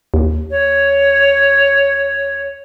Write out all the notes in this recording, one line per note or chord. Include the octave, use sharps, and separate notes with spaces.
D#2
C#5